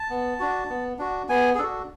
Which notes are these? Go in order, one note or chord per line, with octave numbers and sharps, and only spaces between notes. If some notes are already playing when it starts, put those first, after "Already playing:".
Already playing: A5
B3
D4 F#4
B3
D4 F#4
B3 G#5
G#4
D4 F#4 A4